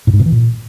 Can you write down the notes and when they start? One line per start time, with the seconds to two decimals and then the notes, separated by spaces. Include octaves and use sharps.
0.07 A2
0.13 G#2
0.20 C3
0.26 E3
0.32 A#2